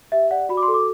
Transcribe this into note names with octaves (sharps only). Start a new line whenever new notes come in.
G4 E5
D5 F#5
F#4 B5
D6
C6
A4
D6